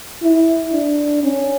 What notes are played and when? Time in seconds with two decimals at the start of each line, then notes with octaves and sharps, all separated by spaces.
0.23 E4
0.73 D4
1.24 C#4